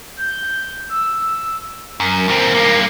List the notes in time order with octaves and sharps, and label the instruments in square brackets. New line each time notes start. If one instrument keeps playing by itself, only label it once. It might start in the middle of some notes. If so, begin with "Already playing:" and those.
[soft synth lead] G6
E6
[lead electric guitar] F#2 [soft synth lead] A#4
[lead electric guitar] D#2 C4
G2 A#3